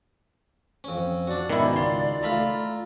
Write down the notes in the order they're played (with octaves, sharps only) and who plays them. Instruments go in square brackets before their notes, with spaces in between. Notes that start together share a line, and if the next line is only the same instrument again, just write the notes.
[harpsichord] F2 C#4
[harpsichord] D4 F#4 [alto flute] D5
[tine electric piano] G#2 B2 C#4 [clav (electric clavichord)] D#3 E4
[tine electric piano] C#2 F4 C6
[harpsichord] A3 F4 [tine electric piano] A#5 B5 F6